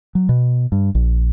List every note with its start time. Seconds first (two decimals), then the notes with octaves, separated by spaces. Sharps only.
0.15 F#3
0.29 B2
0.72 G2
0.95 A#1